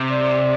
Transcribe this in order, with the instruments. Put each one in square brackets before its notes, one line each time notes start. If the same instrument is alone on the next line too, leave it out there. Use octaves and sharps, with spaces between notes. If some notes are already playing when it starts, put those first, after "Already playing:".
Already playing: [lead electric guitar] C3
[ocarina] D5